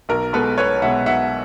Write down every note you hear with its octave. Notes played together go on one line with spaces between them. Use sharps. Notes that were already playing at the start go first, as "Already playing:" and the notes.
B1 A#4
B2 G#3 B3 A4 B4
B1 B4 C#5
B2 G#3 B3 E5 F#5
B1 E5 F#5